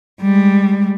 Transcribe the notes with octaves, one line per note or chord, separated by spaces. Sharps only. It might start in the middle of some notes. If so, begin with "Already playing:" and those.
G3 G#3